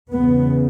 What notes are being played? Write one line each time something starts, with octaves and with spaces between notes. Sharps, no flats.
E2 C#3 B3